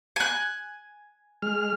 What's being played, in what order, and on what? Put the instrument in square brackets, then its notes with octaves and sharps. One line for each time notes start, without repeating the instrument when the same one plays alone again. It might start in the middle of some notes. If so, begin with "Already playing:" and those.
[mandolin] G#5 F#6
[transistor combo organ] G#3 F6